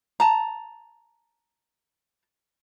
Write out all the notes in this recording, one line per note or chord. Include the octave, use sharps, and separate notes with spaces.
A5 A#5